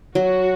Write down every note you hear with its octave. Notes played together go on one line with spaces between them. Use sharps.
F#3 F#4